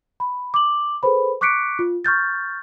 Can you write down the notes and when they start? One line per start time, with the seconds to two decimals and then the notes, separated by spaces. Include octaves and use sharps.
0.20 B5
0.54 D6 F#7
1.03 G#4 A4 B4 C5 B5
1.41 C#6 D6 F#6 B6 C#7 D7
1.79 F4
2.05 C#6 F6 G6 A6